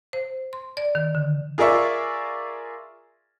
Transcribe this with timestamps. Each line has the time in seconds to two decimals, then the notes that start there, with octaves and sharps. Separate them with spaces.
0.13 C5
0.53 C6
0.77 D5
0.95 D#3
1.15 D3
1.58 F4 G#4 A#4 D5 E5 C#6